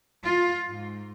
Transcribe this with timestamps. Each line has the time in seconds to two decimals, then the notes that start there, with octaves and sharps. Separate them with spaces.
0.21 F4
0.69 G#2